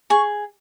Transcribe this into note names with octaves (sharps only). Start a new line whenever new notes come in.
G#4 C#6